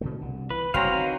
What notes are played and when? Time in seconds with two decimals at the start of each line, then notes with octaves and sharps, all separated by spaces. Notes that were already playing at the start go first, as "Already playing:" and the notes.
0.01 B2 D3 A3
0.21 C2 D3
0.50 E3 B4
0.74 F#1 C2 C#3 F#3 C4 B4 F5 A#5
0.95 D#3